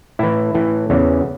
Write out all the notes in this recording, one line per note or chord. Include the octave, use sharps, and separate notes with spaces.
A2 E3 E4
A2 E3
E2 C#3 E3